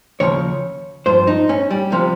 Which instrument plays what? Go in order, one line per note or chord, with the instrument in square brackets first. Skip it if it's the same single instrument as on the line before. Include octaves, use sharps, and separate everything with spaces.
[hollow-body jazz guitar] D#2 C#3 F3 C#5
G2 F3 C5
D#4
C#4
G3
C3 F3